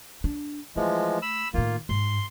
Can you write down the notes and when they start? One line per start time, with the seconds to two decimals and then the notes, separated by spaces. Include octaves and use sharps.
0.24 D4
0.76 E3 F3 G#3 A3
1.22 B5 E6
1.54 A2 D#3 A#3 F4
1.89 G#2 C6